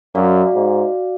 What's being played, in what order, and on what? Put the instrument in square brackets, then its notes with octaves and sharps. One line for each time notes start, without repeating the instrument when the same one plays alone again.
[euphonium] F#2 [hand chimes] F#4 D5 F5
[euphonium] G#2